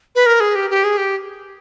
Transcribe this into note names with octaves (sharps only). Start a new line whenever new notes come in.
B4
A#4
G#4
G4
G4
G#4
G4